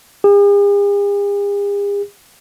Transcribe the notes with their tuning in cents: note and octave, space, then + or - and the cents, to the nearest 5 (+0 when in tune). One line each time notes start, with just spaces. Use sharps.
G#4 -45